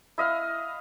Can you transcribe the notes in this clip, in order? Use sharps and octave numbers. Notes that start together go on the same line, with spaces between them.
E4 D#5 F5